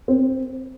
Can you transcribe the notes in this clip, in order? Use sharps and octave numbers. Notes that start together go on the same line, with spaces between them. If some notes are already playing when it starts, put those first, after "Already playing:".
C4